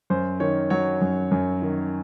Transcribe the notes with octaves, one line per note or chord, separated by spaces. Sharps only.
F#2 C5
D#3 C#5
F#3 C#5
F#2
F#2
D#3